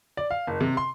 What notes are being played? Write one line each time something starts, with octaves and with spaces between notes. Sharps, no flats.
D5
F5
F#1
C3
C6